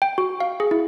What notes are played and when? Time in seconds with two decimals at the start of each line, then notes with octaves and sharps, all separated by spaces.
0.02 G5
0.18 F#4
0.40 F5
0.60 G#4
0.71 E4